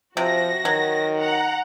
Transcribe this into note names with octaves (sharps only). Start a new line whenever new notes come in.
C3 F3 F#4 A#6
D#3 F#3
F#5 A#5